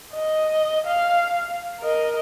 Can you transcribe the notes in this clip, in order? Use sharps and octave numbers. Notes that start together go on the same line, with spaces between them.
D#5
F5
A#4 D#5